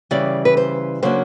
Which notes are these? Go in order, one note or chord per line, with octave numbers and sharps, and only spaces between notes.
C#3 E3 G3 D5
B4
C5
C#3 F#3 A#3 D4 C5